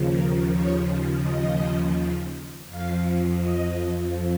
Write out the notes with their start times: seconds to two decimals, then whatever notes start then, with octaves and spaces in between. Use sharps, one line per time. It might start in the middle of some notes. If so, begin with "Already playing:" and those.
Already playing: D#2 C#3 F3
0.13 A#4
0.51 C#5
1.23 D#5
2.68 F2 F3 F5
3.41 D#5